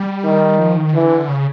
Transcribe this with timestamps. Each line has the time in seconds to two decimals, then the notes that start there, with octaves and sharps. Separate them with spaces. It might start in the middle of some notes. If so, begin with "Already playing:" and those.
Already playing: G3
0.25 D#3
0.59 F3
0.77 D#3
0.94 D3 E3
1.28 C#3